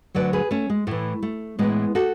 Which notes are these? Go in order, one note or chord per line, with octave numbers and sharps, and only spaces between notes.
D2 D3 F#3 B4 D5
G#4 B4
A3 C#4
G#3
A2 E3 A3
A3
A2 E3 G#3 B3
F#4 A4